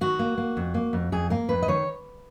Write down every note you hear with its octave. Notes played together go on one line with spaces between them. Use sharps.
D#3 F#4
A#3
A#3
F2
A#3
F2
F2 G#4
A#3 A#4
F2 B4
D#5
D#3 C#5